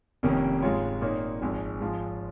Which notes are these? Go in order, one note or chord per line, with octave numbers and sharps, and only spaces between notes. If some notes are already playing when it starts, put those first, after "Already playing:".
F1 F2 D#3 A#3 C#4
G#2 G#3 F4 C#5
A#2 A#3 D#4 C#5
G#1 G#2 F3 G#3
G#2 F3 G#3 F4